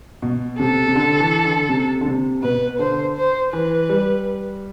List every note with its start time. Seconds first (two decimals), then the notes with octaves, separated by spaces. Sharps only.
0.22 B2
0.59 C3 A4
0.88 C3
0.96 D3
1.20 E3
1.45 D3
1.69 C3
2.01 D3
2.06 C3
2.43 B2 B4
2.79 D3 C5
3.16 C5
3.53 E3 B4
3.90 G3